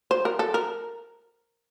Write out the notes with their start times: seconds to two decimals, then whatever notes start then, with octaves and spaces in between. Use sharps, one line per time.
0.11 C5
0.25 A#4
0.39 A4
0.54 A#4